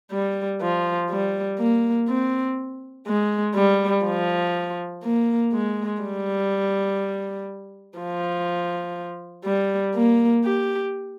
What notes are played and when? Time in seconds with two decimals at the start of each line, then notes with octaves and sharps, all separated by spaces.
0.11 G3
0.61 F3
1.11 G3
1.59 A#3
2.08 C4
3.07 G#3
3.55 G3
4.05 F3
5.04 A#3
5.53 G#3
6.02 G3
7.99 F3
9.45 G3
9.95 A#3
10.45 G4